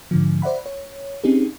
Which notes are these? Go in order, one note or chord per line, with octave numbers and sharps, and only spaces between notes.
G#2 D3 F3
C5 D5 E5 F#5 B5
C#5
C4 C#4 D#4 G4 G#4